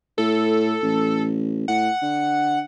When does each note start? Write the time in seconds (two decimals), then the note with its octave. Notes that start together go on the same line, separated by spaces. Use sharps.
0.18 A2 A4
0.83 A1
1.68 A2 F#5
2.02 D3